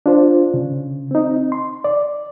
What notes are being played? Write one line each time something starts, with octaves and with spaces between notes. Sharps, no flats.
D4 F4 C5
C#3
C4 D#4
C6
D5